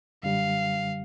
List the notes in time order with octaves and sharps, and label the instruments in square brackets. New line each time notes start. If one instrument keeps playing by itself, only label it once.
[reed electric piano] F#2 D3 G3 [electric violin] F5